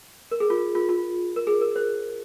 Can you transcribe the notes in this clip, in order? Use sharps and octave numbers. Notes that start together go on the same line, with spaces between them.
A#4
G#4
F4
F4
F4
A#4
G#4
A#4
C5